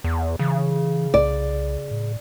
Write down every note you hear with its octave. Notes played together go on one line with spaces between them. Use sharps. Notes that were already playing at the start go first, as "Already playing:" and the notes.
E2
C#3 E3
C2 D5
A2